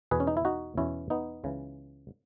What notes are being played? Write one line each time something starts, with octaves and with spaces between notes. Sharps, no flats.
E2 B2 G#4 B4
C#4
D#4
E4
D#4 F#4
E2 B2 C#4 E4
B3 D#4
C#2 C#3 E3